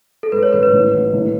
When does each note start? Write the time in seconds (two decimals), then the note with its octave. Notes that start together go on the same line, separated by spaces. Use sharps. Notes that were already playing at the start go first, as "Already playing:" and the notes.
0.23 A4
0.32 G#2 B4
0.43 C#5
0.53 A1 B4
0.63 B4
0.73 A2
0.94 A1
1.13 A2